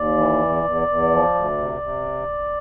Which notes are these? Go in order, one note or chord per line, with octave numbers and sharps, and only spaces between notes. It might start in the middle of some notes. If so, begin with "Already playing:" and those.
Already playing: D#2 D5
E3
E2
E2
E2
F3
D2
C3
C3